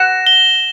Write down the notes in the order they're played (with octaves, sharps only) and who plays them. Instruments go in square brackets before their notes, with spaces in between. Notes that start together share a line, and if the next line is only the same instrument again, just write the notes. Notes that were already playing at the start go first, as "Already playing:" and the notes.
Already playing: [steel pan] F#5 [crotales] A#6 E7
[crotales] G7